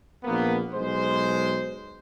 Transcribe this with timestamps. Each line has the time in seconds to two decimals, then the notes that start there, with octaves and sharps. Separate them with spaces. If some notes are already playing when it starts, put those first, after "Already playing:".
0.24 A#1 A#3 B3
0.74 B1 G#3 C5